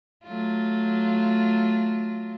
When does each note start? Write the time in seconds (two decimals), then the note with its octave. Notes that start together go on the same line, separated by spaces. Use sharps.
0.25 F#3 A3 F4